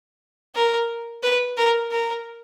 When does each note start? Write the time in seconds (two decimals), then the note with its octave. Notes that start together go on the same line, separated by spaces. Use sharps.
0.55 A#4
1.23 B4
1.57 A#4
1.91 A#4